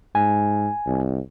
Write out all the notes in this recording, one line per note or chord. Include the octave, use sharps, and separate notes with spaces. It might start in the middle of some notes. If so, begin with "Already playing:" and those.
G#2 G#5
C2